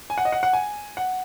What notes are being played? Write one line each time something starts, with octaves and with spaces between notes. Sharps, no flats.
G#5
F#5
D#5
F#5
F#5
G#5
F#5